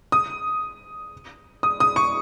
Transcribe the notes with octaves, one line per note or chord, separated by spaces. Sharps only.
D#6
D#6
D#6
C#6